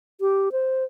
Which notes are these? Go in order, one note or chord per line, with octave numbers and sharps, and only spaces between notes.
G4
C5